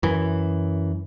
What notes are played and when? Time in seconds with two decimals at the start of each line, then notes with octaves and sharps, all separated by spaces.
0.03 F#2 E3